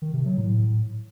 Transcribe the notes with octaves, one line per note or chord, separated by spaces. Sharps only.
D#3
C3
F#3
A2